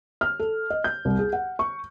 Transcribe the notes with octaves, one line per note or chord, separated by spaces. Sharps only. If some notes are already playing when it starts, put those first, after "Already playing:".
F6
A4
D#5
G6
C2
G#4
F#5
C#6